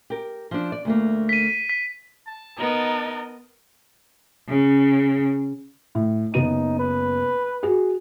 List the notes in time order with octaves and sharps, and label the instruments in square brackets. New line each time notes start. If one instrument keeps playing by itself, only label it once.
[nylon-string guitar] G4 A#4
F3 D4
D5
D2 A3 A#3
[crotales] B6 D#7
B6
[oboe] A5
[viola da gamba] B3 A#4 D#5 [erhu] D#4
[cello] C#3
[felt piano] A2
[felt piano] F#1 B3 D#7 [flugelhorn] D#4
[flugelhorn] B4
[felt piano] F#4 G#4